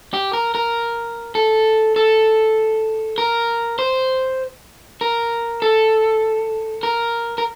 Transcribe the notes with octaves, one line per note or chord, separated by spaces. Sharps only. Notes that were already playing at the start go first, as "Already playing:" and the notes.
G4
A#4
A#4
A4
A4
A#4
C5
A#4
A4
A#4
A#4